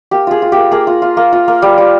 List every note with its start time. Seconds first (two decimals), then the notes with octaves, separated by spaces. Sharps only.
0.11 A#3 G4
0.27 F4 G#4
0.42 F4
0.52 A#3 G4
0.71 A#3 G#4
0.87 F4
1.02 F4
1.17 A#3
1.33 F4
1.48 A#3
1.62 G3
1.78 G3